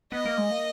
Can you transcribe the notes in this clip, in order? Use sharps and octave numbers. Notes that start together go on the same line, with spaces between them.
B3 D#5
A#3
G#3
A#3